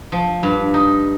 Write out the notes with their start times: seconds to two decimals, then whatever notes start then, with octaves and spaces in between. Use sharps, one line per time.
0.12 F3
0.43 G2
0.74 D#4